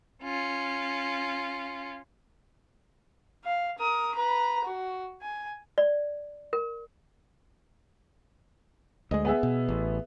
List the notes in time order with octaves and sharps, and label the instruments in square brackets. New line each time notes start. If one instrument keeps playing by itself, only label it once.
[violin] C#4 F4
[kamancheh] F5
A#4 D#6
B4 A#5
F#4
G#5
[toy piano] D5
A#4
[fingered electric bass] D2 G#3 [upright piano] D#5
[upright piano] B3 G#4 E5
[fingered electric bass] B2
A1